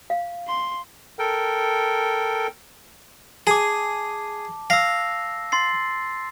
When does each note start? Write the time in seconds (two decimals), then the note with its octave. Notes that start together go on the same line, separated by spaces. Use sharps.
0.10 F5
0.48 C6
1.19 A4 A#4 G5
3.47 G#4 A5 D6
4.70 F5 E6 A#6
5.52 C6 A6 C7